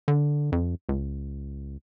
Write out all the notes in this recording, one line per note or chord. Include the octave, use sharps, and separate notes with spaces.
D3
F2
C#2